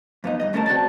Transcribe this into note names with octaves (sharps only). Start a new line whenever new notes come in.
F2 B3 D#4
G2 C#3 D#5
D2 A3 C#4 D#4 A#4 A5
C4 F#4 D5 A5